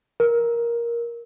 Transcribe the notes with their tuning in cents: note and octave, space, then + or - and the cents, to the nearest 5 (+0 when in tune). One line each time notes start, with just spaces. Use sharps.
A#4 +10